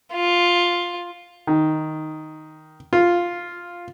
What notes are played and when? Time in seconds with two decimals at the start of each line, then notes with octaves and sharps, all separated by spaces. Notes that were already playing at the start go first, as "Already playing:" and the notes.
0.13 F4
1.47 D#3
2.93 F4